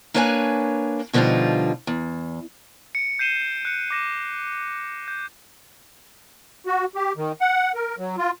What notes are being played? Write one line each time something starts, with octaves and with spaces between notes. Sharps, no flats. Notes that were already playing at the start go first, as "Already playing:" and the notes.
A#3 D4 B4 C#5 E5 G#5
B2 D3 F3 G3 D#4 F4
E2
C#7 D7
G6 C7 D#7 E7 G7
F#6 C#7
D6 A#6 E7
G6
F#4
G4
D#3
F#5
A#4
F#3
F4